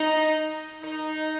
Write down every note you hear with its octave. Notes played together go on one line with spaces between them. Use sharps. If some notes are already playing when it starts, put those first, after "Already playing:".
Already playing: D#4
D#4